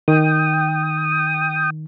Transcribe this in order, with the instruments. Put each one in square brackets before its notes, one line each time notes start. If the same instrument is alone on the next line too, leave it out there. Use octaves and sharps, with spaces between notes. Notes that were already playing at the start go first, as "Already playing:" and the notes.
[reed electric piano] D#3 [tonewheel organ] G5 D#6